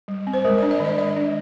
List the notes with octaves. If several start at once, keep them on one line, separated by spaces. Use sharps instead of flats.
G3
C4
C5
G#3 A#4
D5
D4
D5
D#3 D#5
G#3 D5
D4